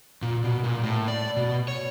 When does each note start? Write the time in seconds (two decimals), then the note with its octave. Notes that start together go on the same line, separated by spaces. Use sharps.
0.22 A#2
0.44 B2
0.64 A#2
0.83 A2
1.08 D5
1.36 B2
1.68 C#5